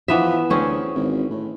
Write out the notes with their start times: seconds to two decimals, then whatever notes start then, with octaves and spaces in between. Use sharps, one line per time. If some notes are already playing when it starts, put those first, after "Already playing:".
0.08 E3 F3 B3 E5
0.50 D2 C4 C#4 G#4
0.95 G#1
1.30 A2